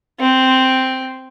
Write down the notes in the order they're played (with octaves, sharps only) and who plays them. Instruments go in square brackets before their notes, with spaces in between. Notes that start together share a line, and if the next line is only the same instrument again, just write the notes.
[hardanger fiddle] C4